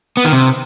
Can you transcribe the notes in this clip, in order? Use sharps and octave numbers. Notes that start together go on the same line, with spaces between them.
B3
D#3
C3